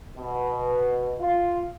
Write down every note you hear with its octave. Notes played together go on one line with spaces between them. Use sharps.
B2
F4